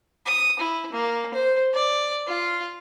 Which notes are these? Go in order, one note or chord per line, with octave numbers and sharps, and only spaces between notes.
D#6
E4
A#3
C5
D5
F4